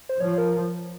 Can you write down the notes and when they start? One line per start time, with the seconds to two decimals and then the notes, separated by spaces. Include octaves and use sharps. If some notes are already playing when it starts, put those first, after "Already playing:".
0.09 C5
0.20 F3 C#5
0.38 A#4